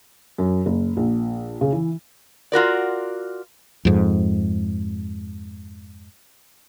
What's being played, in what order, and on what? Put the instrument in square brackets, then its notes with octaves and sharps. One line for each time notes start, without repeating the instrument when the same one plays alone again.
[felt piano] F#2
F#1
A#1
C#3
E3
[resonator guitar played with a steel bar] F4 F#4 A#4 D5
[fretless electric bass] F2 G#2